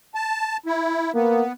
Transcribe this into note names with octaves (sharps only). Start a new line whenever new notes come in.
A5
E4
A#3 B3